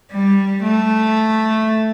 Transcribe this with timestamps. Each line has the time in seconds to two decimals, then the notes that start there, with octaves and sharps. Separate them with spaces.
0.11 G3
0.63 A3